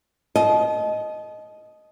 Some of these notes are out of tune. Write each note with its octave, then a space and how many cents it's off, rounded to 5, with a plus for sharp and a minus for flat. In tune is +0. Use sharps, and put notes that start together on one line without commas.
D#5 +0 A5 -35